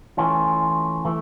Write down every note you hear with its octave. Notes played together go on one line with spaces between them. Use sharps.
E3 A3 C#4 F4
E3 A3